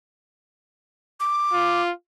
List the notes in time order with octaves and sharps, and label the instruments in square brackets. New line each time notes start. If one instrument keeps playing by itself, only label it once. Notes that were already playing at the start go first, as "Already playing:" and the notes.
[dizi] D6
[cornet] F4